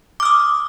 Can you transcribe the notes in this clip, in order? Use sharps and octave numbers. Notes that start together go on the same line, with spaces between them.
D6 D#6 F6